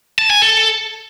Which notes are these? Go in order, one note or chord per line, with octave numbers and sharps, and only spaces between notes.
A5
G#5
A4